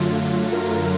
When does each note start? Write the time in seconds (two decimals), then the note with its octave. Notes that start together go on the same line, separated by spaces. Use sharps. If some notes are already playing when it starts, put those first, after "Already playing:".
Already playing: F#2 D3 F#3 A3 F4
0.53 A#4